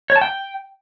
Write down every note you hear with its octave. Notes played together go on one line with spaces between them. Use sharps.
C#5
A5
G5